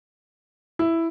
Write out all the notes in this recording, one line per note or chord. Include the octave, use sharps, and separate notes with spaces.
E4